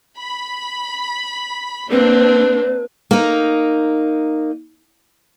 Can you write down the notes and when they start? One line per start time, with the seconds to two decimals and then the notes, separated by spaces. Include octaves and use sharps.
0.18 B5
1.91 A#3 C4 D4 B4
3.11 A#3 D#4